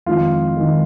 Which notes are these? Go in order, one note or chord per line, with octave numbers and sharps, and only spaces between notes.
F2 D#3 G#3 F4
D#3 G#3